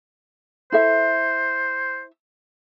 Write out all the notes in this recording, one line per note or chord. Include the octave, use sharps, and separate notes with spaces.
E4 A4 C5 E5